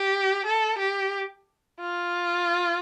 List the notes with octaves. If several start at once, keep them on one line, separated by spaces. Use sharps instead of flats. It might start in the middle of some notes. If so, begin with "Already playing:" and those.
Already playing: G4
A4
G4
F4